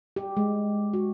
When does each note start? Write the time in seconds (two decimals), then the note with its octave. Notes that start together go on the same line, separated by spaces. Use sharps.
0.16 G4
0.37 G#3
0.94 F#4